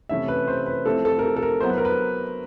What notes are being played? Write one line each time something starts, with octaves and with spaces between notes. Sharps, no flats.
C3 E3 A3 C#4 E4 E5
B4
C5
B4
F3 A3 C4 E4 A4
A4
A#4
A4
A4
A#4
F#3 B3 E4 C5
B4
A#4
B4